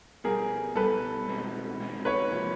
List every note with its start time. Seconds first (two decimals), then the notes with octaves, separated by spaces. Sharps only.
0.24 B2 G3 B3 G#4 A#4
0.76 B2 G3 B3 A4 B4
1.28 B2 G#3 C4 D#4 F#4
1.79 B2 G#3 C4 D#4 F#4
2.05 B4 C#5
2.31 C3 F3 A#3